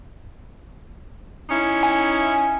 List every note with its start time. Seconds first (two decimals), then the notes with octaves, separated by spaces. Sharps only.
1.49 C#4 D#4 E4
1.83 G#5